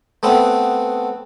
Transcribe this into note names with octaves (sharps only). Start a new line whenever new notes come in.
A3 B3 C4